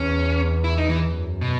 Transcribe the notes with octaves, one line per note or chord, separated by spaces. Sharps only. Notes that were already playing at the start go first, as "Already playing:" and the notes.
Already playing: E2 C#4
E4
D#4
E3
F#2
B2